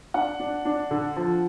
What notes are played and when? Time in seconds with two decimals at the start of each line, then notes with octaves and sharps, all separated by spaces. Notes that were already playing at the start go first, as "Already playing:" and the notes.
0.14 D4 F#5
0.40 D4
0.65 D4
0.91 D3
1.16 F3